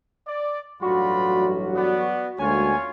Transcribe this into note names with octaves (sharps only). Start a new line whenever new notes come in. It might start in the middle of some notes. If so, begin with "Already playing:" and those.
D5
A1 G2 F#3 F4 F#4 D5 B5
B3 D5
D2 G#3 A#3 C#4 F4 F#4 C#5 G#5